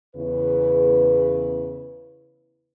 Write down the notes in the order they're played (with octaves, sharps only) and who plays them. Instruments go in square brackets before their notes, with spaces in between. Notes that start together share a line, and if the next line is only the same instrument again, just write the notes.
[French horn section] E2 C#3 E4 B4